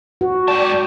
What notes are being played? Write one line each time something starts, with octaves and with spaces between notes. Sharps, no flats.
F#4
G#2 D5 G5 A5